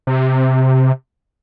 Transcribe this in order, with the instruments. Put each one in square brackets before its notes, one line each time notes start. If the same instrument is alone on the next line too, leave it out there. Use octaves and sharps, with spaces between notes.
[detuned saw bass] C3